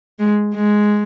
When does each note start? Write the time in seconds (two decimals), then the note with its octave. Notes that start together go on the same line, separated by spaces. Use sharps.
0.19 G#3
0.54 G#3